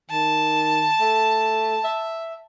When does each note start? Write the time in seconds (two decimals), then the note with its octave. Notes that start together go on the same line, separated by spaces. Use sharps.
0.10 D#3 A5
1.01 A3
1.84 E5